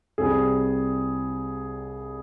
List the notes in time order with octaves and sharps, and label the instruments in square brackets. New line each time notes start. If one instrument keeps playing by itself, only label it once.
[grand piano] C2 C3 G3 G#4